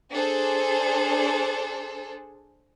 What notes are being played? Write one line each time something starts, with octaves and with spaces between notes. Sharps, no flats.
D4 G#4 A4 C5